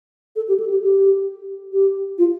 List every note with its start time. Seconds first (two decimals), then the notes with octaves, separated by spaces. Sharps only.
0.36 A4
0.48 G4
0.60 A4
0.70 G4
0.82 G4
1.72 G4
2.18 F4